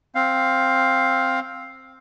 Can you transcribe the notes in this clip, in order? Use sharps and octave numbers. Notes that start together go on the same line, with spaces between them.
C4 F5